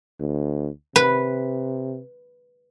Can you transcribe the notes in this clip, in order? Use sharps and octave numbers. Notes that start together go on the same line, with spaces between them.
D2
C3 B4